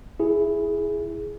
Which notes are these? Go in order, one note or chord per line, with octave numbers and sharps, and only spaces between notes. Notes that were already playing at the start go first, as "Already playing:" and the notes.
E4 G#4